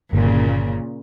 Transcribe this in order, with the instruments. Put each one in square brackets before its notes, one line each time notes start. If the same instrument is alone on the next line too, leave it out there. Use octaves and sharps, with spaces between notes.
[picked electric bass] G1 [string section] A#2 C#3